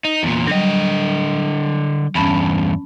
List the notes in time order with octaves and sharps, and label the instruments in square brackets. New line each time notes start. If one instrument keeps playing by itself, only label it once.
[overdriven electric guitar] D#4
E2 A#2
[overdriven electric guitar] D3 D#5 [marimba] F#3 G3
[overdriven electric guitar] E2 G2 [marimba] C#4 A5 B5